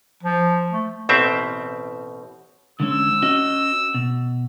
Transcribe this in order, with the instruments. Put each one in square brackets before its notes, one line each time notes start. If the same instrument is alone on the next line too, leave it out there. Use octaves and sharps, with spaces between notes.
[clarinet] F3
A3
[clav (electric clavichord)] A1 B2 C4 E5
[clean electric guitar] D3 G#3 C#4 [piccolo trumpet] E6
[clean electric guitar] C#4 F#4 D#5
B2